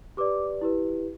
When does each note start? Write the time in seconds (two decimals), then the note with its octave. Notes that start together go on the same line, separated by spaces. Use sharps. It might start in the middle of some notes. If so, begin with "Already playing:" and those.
0.17 G4 B4 D5 D6
0.61 E4 G4 B4